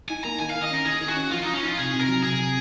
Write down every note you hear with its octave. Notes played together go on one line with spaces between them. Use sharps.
D#4 G#5
A#3 A#5
D#3 G#5
D#3 F5
D#5
C#4 A#4
D#3 G#4
D#3
F#4
C#4
F3 F4
F3 D#4
C#4
D#4 F4
C3 G#4
C3
A#4
F#3
C3 G#4
C3